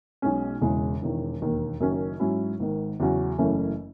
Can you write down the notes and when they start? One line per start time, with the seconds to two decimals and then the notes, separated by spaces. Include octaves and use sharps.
0.22 B1 B2 G#3 C#4
0.61 E1 E2 C#3 G#3
1.02 E1 E2 D#3
1.41 E1 D#2 D#3
1.80 F#1 F#2 D#3 F#3 C#4
2.20 G#2 F#3 C#4 E4
2.60 G#1 G#2 D#3
3.00 E2 C#3 F#3 C#4 F#4
3.38 F#1 F#2 E3 A3 C#4